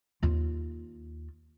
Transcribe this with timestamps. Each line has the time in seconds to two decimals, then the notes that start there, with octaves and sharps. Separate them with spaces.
0.23 D#2 F4